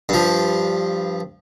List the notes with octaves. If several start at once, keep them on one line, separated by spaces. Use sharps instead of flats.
G2 F3